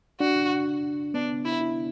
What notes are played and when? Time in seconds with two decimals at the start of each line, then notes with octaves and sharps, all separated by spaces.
0.20 D4 F#4
1.14 B3 D4
1.45 E4
1.61 E4